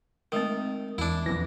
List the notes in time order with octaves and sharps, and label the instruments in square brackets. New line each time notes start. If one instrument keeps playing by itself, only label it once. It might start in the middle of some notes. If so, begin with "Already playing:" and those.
[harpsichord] D#3 [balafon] G#3 A3 C4
[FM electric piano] E2 [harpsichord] D4 E4
[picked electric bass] A#1 F2 E3 [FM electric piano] A#6